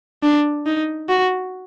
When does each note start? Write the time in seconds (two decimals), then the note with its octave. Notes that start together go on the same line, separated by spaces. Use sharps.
0.23 D4
0.66 D#4
1.09 F#4